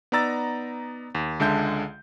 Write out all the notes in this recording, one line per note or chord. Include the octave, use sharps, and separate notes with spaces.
B3 D#4 D5 A#5 E6 A6
D#2
C#2 D3 G#3 E5 A5 G6